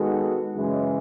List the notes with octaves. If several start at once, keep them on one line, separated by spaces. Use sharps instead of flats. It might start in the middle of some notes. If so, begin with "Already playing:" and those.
Already playing: D#3 G#3 B3 F#4 A4
F#2 C#3 E3 G#3